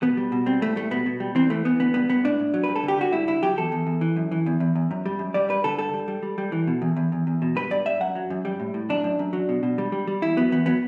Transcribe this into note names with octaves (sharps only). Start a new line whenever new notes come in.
B2 B3
G3
B2
G3 C4
A2 A3
G3 A3
B2 B3
B2
G3
E3 C4
E3 A3
E3 B3
D3 B3
G2 B3
G2 B3
A2 D4
A2
F#3
G2 B4
A4
D3 G4
D3 F#4
G2 E4
D3 E4
F#3 G4
E2 A4
E2
E2
E3
F#2
E3
E2
E2
E2
F#2
G3
F#2
G3 D5
G2 B4
D3 A4
G2 A4
G3
G3
G3
G3
E3
B2
E2
E2
E2
E2
B2
G2 B4
G2 D5
G2 E5
F#2 F#5
F#3
F#2
G3
A2
A2
F#2 D4
F#2
F#2
F#3
B2
B2
G3
G3
G3
E2 E4
F#3 B3
E2 B3
F#3 B3